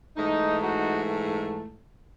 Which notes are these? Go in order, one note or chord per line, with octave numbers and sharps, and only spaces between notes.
G#2 E3 A3 D#4
D#4 F#4